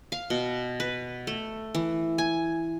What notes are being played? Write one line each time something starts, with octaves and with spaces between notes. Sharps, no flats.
F5
B2
B4
A3
E3
G#5